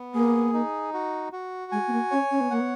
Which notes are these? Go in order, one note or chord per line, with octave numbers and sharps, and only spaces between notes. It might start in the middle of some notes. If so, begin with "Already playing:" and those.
Already playing: B3
A#3 G#4
D#4
F#4
F#4
G#3 G#5
B3
A#3
C#4 C#5
C#4
B3
A#3 F#5
B3